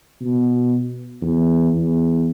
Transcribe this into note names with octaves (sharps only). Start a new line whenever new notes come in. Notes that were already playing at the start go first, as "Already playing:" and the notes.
B2
E2
E2